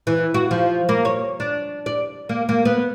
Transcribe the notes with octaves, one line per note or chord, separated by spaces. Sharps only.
E3
F#4
F3
A#3
C#5
D4
D5
A#3
A#3
B3